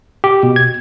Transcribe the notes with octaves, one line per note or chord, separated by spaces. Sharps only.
G4
B2
G#6